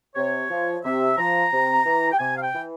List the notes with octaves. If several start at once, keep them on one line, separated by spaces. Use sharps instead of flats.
C3 C#5
F3
C3 E5
F3 A#5
C3
E3
G5
C3 G#5
F5
G5
E3